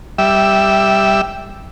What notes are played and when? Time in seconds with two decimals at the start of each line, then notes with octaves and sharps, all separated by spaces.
0.18 G3 E5